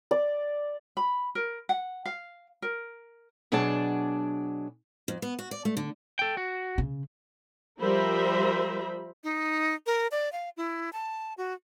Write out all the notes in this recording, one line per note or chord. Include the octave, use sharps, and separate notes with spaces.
D5
B5
A#4
F#5
F5
A#4
B2 F#3 D4 G#4 D5 A5
F2
B3
F#4
D5
A3
D3
A4 G5
F#4
C#3
F3 G3 A#4 C5 E5 B5
D#4
A#4
D5
F5
E4
A5
F#4